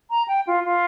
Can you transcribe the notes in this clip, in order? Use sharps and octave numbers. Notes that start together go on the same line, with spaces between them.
A#5
G5
F4
F4